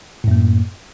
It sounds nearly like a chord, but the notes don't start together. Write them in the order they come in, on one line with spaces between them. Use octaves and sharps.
A2 F#2 A#3